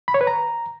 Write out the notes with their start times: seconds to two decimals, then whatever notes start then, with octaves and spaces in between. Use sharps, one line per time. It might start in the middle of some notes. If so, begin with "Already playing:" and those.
0.08 B5
0.14 C#5
0.21 B4
0.27 A#5